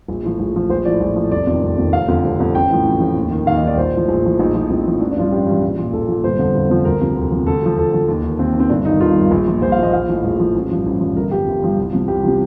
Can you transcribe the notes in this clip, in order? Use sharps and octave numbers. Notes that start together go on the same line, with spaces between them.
A#1
A2 F3
A#1
A2 F3
A#1 C5
A2 F3 D5
A#1
A2 F3
F1 D5
F2 D#3
F1
F2 D#3
F1 F5
F2 D3
F1
F2 D3
A1 G5
A2 F3
A1
A2 F3
D#2
D#3
D#2 F5
D#5
D#3 D5
A#1 C5
A2 F3
A#1
A2 F3
A#1 D#4
A2 F3
A#1 C4
A2 F3
A1 D4
D4
G2 F3 F4
A1 G4
G2 F3
A#1
A#2 F3
A#1 A4
A#2 F3
G1 C5
F2 D3 F3
G1
F2 D3 F3
D2 A#4
C3 F3
D2
C3 F3
D2 A4
D3 F3
D2 A4
D3 F3
D#2
D#3
D#2 C4
D#3
C4
G1 D4
G2 D#3 D#4
G1 F4
G2 D#3
A#1
A#2 F3
A#1 C5
F5
A#2 F3 D#5
A#1 F5
A2 F3
A#1
A2 F3
A1
G2 F3
A1
G2 F3
G1 A#4
G2 F3 G4
G1
G2 F3
C2
C3 F3
C2 G4
C3 F3